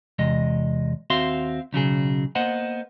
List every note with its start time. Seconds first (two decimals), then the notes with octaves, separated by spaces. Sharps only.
0.19 E2 C3 G#3 D#5
1.10 D#2 C4 F#4 E5 F5 C6
1.73 B1 C#3 F#3 G#4
2.35 A#3 B3 C5 D#5 F#5